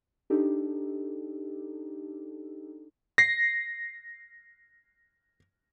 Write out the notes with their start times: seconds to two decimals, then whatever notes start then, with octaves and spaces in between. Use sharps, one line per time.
0.30 D4 D#4 G4 A4
3.18 A#6 C7